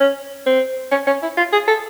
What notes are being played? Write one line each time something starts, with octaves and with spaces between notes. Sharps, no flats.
C#4
C4
C#4
C#4
E4
F4
G#4
A4